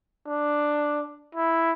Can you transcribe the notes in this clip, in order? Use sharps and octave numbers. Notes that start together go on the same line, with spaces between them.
D4
E4